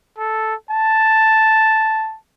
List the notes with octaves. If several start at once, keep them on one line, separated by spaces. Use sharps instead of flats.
A4
A5